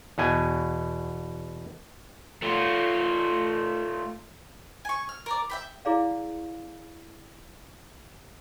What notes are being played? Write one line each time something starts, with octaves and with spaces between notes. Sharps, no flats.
E2 B2 G#5
A3 F4
G#5 C#6
F6
A#4 D5
E5 G5 B5
E4 G#4 D5 F5